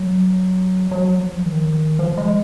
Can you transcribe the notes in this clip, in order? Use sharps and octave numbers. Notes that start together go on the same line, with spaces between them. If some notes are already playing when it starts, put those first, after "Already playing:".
Already playing: F#3
F#3
F3
D#3
F3
G#3